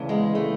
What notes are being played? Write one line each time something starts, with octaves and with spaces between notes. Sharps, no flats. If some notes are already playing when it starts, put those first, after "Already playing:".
Already playing: D2 C#3 E3
G#3 B3
A3